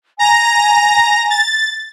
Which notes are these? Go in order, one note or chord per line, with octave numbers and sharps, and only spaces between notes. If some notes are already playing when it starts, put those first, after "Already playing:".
G#5 A#5 A#6
A6